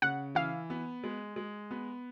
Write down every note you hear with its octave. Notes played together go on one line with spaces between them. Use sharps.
C#3 F#5
E3 F5
B3
G#3
G#3
B3